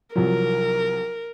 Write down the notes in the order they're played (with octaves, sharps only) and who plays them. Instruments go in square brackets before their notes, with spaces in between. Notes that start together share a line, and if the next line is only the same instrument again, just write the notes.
[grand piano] C2 F3 F#3 [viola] A#4